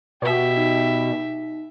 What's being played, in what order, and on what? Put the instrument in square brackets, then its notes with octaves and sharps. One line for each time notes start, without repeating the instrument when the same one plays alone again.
[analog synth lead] B2 [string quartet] G4 E5
[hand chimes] D#4